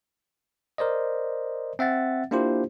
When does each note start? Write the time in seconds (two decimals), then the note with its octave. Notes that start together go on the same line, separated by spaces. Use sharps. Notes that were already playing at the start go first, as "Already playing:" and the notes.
0.78 A#4 C5 D5 D#5
1.79 C4 E5 F#5 A6
2.31 A#3 D4 E4 F4 G4 C5